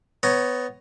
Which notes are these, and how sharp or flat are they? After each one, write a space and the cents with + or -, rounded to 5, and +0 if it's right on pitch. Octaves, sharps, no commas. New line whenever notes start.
B3 +15 C#5 +0 A#5 +0